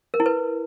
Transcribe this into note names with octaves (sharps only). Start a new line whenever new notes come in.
A#4
E4
B4